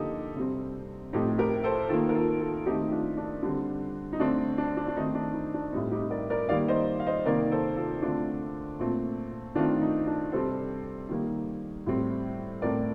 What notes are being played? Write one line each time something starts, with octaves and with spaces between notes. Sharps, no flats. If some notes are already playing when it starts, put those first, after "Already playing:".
Already playing: D3 F3 A#3 D#4 G4 A4
C3 G3 C4
A2 F3 A3 C4 D#4 G4
G4 A#4
A4 C5
D#3 A#3 F4 A4
A#4
F4 A4
F4 A4
D#3 A3 C4 D#4 G4
D4 F4
D4
D3 G3 C4
D#4
D3 A3 C4 D4
D4
D4
D4
D#3 A3 C4 D#4
D4
D#4
D4
A2 G3 C4 D#4
D#4 G4
A#4 D5
A#4 D5
D#3 G3 A#3 D5 F5
C5 D#5
F5
C5 D#5
C3 D#3 A#3 A#4 D5
A4 C5
F4 A4
D3 A3 C4 D4 F4
A#2 A3 C4
D#3 A3 C4 D4 F4
F4
D#4
D4
C3 G3 C4 A4 C5
D#3 G3 A#3
A2 G3 C4
A2 A3 C4 A#4 D5